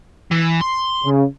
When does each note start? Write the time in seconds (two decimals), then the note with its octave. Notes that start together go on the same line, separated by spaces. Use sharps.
0.31 E3
0.61 C6
1.04 C#3